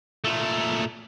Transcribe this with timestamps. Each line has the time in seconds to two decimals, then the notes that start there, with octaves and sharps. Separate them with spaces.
0.24 A#2 A3